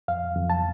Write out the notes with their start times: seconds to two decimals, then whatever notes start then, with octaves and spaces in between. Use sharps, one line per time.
0.08 F2 F5
0.36 F2
0.50 A5